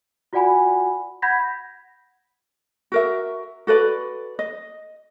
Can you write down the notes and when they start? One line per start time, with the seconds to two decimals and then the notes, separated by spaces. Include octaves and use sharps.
0.33 F4 F#4 D5 F#5 G#5 B5
1.22 F#5 B5 G6 G#6 A#6 B6
2.92 F#4 A#4 E5
3.67 F#4 A4 B4 D5
4.39 D#5